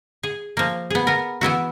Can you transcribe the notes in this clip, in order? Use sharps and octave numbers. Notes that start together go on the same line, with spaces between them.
G#4
F3 A#3
B3 G#4
B3 A#4
E3 B3 E4 F#4